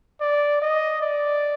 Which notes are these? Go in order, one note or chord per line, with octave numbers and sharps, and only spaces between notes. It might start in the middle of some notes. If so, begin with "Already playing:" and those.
D5
D#5
D5